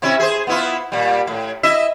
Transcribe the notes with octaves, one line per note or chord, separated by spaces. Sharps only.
C3 C#4 E4
G#4 C5
B3 E4 F4
A#2 G3
A2
E4 D#5 E5